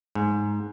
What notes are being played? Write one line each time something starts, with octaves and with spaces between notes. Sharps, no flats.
G#2